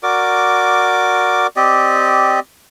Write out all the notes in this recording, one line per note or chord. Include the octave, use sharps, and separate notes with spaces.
F#4 A#4 D5 D6
C4 G4 D5 D#5